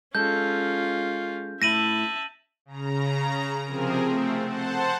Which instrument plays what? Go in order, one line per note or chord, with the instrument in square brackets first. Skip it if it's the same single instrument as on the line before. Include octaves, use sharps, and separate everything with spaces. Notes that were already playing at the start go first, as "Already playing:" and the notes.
[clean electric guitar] G#3 A4 [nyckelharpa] C#4 F4 [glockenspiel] G6
[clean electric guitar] A2 E4 [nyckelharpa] E5 A5 [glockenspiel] A#6 D#7 F#7
[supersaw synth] C#3 A#5
C3 F3 C4 G#4 A#4
A3 C4
C5 F#5 A5